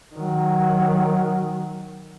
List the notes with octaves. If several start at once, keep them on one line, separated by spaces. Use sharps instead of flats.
D#3 F#3